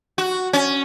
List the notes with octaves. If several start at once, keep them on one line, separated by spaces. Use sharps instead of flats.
F#4
C#4